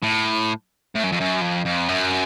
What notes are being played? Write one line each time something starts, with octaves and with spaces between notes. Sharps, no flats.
A2
A2
F#2
F2
F#2
F2
F2
F#2